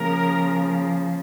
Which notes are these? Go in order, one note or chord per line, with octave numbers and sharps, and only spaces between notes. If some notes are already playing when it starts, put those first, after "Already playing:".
Already playing: C#3 F3 A#3 A#4